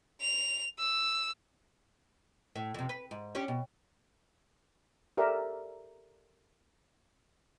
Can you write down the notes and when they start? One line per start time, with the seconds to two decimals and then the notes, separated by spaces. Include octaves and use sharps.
0.21 F7
0.79 E6
2.56 A2
2.74 F2 C3
2.89 B4
3.11 G#2
3.35 C#4 D4 G4
3.48 B2
5.17 G4 A4 A#4 D5 E5